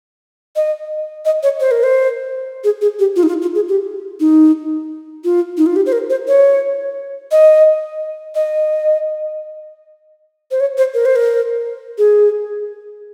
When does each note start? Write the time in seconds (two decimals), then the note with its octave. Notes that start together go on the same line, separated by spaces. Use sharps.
0.56 D#5
1.25 D#5
1.43 C#5
1.60 C5
1.71 A#4
1.83 C5
2.64 G#4
2.81 G#4
2.99 G4
3.16 F4
3.23 D#4
3.28 F4
3.42 F4
3.55 G#4
3.69 G4
4.20 D#4
5.24 F4
5.58 D#4
5.66 F4
5.76 G4
5.86 C5
5.92 A#4
6.10 C5
6.28 C#5
7.31 D#5
8.35 D#5
10.51 C5
10.60 C#5
10.77 C5
10.94 A#4
11.05 C5
11.16 A#4
11.98 G#4